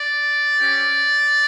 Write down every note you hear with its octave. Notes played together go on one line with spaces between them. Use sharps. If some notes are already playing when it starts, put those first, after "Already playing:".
Already playing: D5
C#4 G4